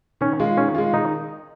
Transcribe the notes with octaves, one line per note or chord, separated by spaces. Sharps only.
D#3 C#4
G#3 F4
D#3 C#4
G#3 F4
D#3 D#4